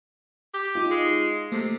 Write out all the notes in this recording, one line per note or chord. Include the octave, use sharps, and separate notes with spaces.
G4
D#4 F4
G#3
C3 A3 A#3 A4